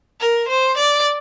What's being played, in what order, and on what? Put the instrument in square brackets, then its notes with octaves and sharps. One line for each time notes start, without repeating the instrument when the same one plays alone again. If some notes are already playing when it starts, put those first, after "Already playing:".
[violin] A#4
C5
D5